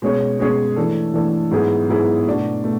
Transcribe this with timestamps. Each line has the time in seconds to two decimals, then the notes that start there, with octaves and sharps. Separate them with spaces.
0.02 B2 G#3 C#4 G#4 C#5
0.39 B2 G#3 C#4 G#4 C#5
0.76 E3 A3 D4 A4
1.14 E3 A3 D4 A4
1.51 G#2 F#3 B3 E4 G#4
1.89 G#2 F#3 B3 E4 G#4
2.26 B2 A3 D4 F#4
2.63 B2 A3